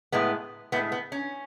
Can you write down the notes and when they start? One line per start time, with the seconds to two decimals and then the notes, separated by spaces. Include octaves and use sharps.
0.12 A2 G#3 B3
0.72 A2 G#3 B3
0.92 B3
1.12 C#4